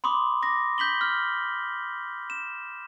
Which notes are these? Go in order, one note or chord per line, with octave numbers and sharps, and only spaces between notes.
B5 C6 D6 D#6
D6 A#6
G6 B6 F#7 G7
F6
E7